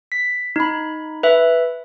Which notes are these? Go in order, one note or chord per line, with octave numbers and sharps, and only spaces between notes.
B6
D#4 B5
B4 E5